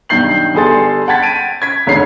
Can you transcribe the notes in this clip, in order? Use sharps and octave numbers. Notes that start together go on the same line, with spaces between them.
B1 G2 D#3 G6 C7 F#7
G1 G3 G#4 A4 C6 A6
F#5 G5 A5 G#6 A6 B6
D7 D#7
G#6 B6
F1 G#2 D3 C#5 C7